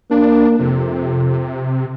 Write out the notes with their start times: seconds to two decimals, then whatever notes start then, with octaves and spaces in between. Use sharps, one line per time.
0.11 A#3 D4
0.59 F2 C3